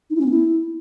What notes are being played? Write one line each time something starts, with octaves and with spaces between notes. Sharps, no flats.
D#4
E4
C#4
B3
E4